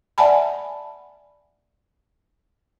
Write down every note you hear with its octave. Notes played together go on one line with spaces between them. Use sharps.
D5 E5 F#5 G#5 A5 B5